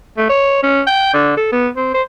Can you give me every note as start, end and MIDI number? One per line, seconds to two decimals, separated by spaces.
0.17 0.27 57
0.29 0.61 73
0.63 0.81 61
0.87 1.13 79
1.14 1.35 50
1.37 1.50 69
1.52 1.68 59
1.76 1.89 60
1.94 2.02 72